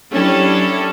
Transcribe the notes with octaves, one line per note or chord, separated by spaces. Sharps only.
F#3 C#4 D4 E4 G4 A4